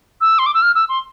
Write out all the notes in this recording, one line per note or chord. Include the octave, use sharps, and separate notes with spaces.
E6
C6
D6
E6
F6
E6
C6